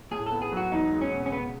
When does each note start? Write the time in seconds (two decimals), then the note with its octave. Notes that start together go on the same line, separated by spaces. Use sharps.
0.11 A2 G#4
0.26 A4
0.32 B3
0.42 G#4
0.52 F#3
0.57 F#4
0.72 E2 D#4
0.92 G#3
1.01 C#4
1.12 B2
1.26 C#4
1.32 C#3 B3